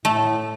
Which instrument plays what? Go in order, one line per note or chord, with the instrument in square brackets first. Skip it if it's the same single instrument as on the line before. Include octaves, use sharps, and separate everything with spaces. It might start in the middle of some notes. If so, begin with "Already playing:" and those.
[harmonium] A2 [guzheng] A3